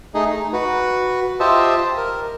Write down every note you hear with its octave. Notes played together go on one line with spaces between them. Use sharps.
A3 D#4 G#4 D#5
D#4
F#4 B4
F4 G4 C5 D#5 E5 A5
A#4